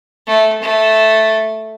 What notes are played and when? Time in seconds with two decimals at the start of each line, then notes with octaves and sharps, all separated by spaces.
0.27 A3
0.62 A3